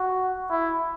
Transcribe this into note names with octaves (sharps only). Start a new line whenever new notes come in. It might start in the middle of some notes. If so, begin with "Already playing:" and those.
Already playing: F#4
E4